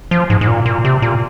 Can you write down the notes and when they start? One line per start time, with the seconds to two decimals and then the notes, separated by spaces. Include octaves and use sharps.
0.11 F3
0.30 G#2
0.41 G#2
0.47 A#2
0.66 A#2
0.85 C3
1.02 A#2